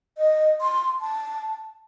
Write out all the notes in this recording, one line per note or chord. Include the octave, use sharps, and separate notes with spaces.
D#5
C6
A5